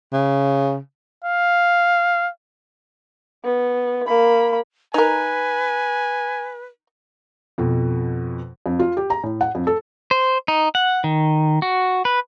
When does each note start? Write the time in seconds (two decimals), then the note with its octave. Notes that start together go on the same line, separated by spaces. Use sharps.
0.13 C#3
1.24 F5
3.44 B3
4.07 A#3 B5
4.94 D#4 A#4 B4 G#5
7.58 F2 B2
8.66 F2
8.79 F4
8.97 G4
9.10 A#5
9.24 A2
9.41 F#5
9.55 F2
9.67 A4
10.11 C5
10.48 D#4
10.75 F#5
11.04 D#3
11.62 F#4
12.05 B4